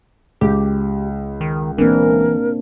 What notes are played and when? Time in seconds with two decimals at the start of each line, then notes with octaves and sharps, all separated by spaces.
0.41 C#2 G4
1.41 D#3
1.78 E3 A#3 C4 D4 A#4